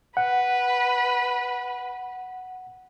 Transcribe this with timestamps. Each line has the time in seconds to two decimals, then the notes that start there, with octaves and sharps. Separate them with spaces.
0.17 B4 F#5